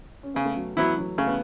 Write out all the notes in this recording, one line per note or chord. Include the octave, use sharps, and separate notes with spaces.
C#4
C#3 B3
A3
F#3
E3 F#3 B3 E4
F#3
C#3 A3
B3